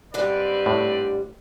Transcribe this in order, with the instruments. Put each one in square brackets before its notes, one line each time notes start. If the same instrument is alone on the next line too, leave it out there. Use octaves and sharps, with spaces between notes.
[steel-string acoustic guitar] G#2 D3 G3 [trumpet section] C4 B4 D5
[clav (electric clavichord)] A2